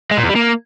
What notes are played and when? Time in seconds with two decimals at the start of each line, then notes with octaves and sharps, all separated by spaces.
0.11 G#3
0.17 A#2
0.23 E2
0.30 G3
0.36 A#3